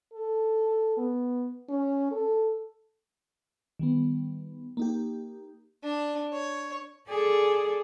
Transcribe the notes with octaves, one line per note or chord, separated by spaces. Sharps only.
A4
B3
C#4
A4
D#3 G3 B3
A#3 D#4 G4
D4
C#5
G#4 A4 D5